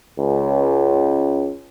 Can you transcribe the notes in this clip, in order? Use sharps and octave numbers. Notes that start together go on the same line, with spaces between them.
C#2 C#4